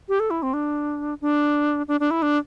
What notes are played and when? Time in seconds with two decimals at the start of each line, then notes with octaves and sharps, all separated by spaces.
0.09 G4
0.20 A4
0.30 E4
0.43 C4
0.53 D4
1.21 D4
1.88 D4
2.00 D4
2.11 E4
2.22 D4